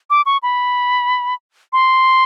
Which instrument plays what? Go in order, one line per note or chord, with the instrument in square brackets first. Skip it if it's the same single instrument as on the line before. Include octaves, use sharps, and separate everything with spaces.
[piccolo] D6
C#6
B5
C6